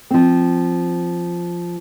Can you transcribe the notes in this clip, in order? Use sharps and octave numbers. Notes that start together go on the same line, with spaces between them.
F3 C4